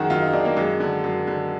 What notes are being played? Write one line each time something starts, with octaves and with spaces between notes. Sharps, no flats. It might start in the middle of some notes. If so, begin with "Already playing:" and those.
Already playing: F#2 D#3 F#4 G#4
F#2 F4
D#4
D#3 D4
A#3
F#2 G#3
D3
F#2
D3